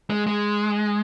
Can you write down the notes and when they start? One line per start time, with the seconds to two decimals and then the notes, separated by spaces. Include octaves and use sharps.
0.10 G#3
0.27 G#3